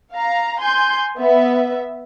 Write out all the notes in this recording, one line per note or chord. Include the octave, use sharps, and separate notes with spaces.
F5 A#5
G#5 C6 G6
B3 E5